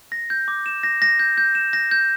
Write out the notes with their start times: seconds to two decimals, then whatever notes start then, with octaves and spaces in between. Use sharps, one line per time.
0.12 A#6
0.30 G6
0.48 D6
0.66 E7
0.83 A#6
1.02 A#6
1.19 G6
1.38 G6
1.55 E7
1.73 A#6
1.91 G6